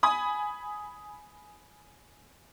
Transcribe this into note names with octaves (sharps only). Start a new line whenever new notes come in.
G#5 B5 D#6